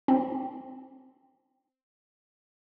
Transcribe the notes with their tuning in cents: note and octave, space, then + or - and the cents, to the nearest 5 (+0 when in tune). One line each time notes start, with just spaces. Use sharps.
C4 +5